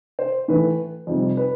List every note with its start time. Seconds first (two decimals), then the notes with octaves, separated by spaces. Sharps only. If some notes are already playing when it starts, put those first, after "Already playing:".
0.19 C5
0.48 A2 E3 A3 B4
1.07 F2 C3 G3
1.37 B4